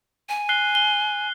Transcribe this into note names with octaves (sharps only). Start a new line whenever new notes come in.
G#5
F#6 C7 G7
G7